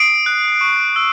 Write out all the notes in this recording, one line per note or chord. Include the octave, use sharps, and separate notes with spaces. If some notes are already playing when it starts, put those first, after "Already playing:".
Already playing: D#6 C7 D7
F#6
C#6
E6